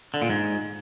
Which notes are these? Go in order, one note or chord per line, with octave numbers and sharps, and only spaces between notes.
D3
A#2
G#2